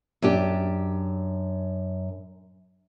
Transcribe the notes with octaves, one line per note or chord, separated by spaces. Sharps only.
F#2 D4 G4